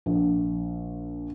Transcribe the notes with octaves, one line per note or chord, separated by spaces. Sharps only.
A#1